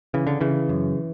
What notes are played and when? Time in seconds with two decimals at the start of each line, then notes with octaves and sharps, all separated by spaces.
0.14 C#3 E3
0.27 D3
0.41 C#3 E3
0.69 F#2